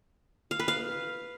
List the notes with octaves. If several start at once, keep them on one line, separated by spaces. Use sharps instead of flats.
F5
B4
F5